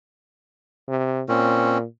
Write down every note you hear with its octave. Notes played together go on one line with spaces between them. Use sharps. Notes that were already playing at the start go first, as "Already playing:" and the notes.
C3
A#2 C4 C#4